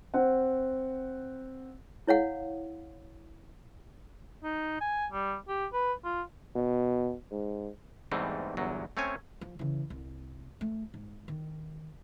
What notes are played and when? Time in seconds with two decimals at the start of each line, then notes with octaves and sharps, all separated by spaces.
0.14 C4 F#5
2.07 E4 C#5 F5 F#5
4.43 D#4
4.81 G#5
5.12 G3
5.48 G4
5.73 B4
6.04 F4
6.56 B2
7.31 G#2
8.11 E2 G#2 E3 G3 A3 C4
8.57 G1 E2 F#3
8.97 A3 C4 C#4 C#5 G#5
9.41 F3
9.59 C#3 E3
9.90 C2
10.61 A3
10.94 G#2
11.28 D#3